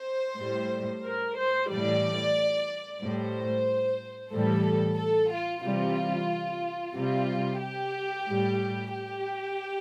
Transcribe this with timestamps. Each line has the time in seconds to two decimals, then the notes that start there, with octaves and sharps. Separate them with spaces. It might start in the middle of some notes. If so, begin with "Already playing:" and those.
Already playing: C5
0.38 A2 G3
1.03 A#4
1.37 C5
1.70 A2 E3 G3 D5
3.01 A2 G3 C5
4.32 A2 E3 G3 A4
4.98 A4
5.31 F4
5.64 C3 E3 G3 F4
6.95 C3 G3 F4
7.61 G4
8.27 A2 G3
8.92 G4